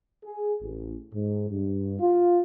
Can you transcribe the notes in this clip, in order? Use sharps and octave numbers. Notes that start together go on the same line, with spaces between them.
G#4
A1
G#2
G2
F4